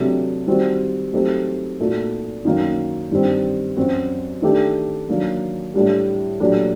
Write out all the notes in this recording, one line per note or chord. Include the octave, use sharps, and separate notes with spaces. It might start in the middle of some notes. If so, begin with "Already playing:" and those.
Already playing: C3 F#3 A3 D4 G4
D#3 G3 C4 F#4
F#3 A3 C4 D#4 G4
A#2 A3 D#4 F#4
F#2 D#3 F#3 A#3 D#4
G2 D#3 G3 C4
F#2 F#3 C4 F#4
D#3 A3 D4 G4
D#3 F#3 A#3 D4
A2 G3 D4 G4
A#2 F#3 A3 D4 G4